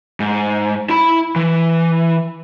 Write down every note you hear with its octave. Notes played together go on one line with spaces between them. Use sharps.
G#2
E4 B5
E3